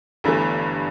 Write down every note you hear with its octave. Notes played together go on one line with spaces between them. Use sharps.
G1 G2 E3 A3